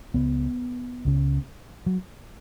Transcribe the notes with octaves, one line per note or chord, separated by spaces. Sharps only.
C#2 C#3 B3
C#2 C#3
F#3